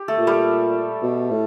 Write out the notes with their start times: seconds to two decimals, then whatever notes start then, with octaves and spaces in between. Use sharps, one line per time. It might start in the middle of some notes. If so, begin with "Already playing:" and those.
Already playing: G4
0.08 A3 A4
0.18 A#2
0.27 G3 G4
1.02 B2
1.31 A2